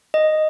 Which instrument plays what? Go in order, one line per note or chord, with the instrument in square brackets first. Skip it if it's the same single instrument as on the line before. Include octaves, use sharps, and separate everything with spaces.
[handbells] D#5